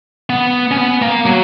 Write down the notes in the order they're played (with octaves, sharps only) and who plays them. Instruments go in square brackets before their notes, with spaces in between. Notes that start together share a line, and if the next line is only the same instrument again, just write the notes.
[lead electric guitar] B3
C#4
B3
A#3
F#3